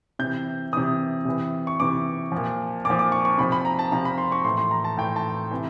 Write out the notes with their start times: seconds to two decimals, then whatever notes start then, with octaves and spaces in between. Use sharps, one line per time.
0.19 C3 E3 G6
0.73 C3 E3 D#6
1.25 C3 E3
1.67 C#6
1.79 C3 E3 D6
2.32 A#2 F3
2.85 A#2 F3 D6
2.99 D6
3.12 C#6
3.25 C#6
3.38 C3 F3 B5
3.52 B5
3.65 A#5
3.79 A5
3.92 C3 F3 A#5
4.05 B5
4.18 C6
4.32 C#6
4.44 A2 E3 C6
4.58 C6
4.71 A#5
4.84 A5
4.97 A2 E3 G5
5.16 A5
5.51 C3 E3